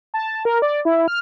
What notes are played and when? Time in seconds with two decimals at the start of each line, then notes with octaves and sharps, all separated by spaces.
0.14 A5
0.45 A#4
0.62 D5
0.85 E4
1.08 F6